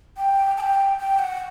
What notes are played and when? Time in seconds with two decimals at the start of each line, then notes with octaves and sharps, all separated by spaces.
0.17 G5
0.57 A5
0.60 G5
0.99 G5
1.19 F#5